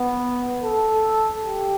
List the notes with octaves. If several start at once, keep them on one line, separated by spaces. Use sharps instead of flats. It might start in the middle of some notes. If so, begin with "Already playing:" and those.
Already playing: B3
A4
G4